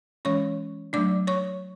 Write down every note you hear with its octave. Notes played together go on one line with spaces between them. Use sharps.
E3 G#3 C#4 C#5 C#6
F#3 A3 D4 D5 D6
C#5 C#6